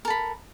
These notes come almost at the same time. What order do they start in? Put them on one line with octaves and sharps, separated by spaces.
A#4 A4 B5